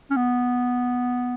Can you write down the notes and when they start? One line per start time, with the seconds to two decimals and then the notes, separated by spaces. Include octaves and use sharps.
0.10 C#4
0.16 B3